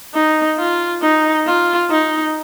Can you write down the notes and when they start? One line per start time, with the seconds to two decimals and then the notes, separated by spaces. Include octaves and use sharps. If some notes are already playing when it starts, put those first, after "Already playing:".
0.14 D#4
0.58 F4
1.02 D#4
1.46 F4
1.90 D#4